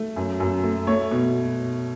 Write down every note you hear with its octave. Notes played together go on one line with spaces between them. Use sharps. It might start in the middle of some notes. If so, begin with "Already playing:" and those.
Already playing: A3
F#2
F#2
A3
A3 C#5
B2